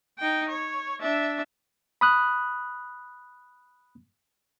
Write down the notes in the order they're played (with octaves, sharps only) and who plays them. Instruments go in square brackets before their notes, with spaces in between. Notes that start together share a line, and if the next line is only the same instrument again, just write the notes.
[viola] D#4 G5
C#5
D4 E5
[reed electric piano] B5 D#6 F#6